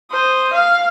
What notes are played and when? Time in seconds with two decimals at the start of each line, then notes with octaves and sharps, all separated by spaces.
0.11 C5 D#6
0.53 F5